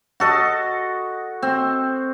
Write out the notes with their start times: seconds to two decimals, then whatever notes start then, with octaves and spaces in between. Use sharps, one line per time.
0.20 F#4 A4 D#5
1.42 C4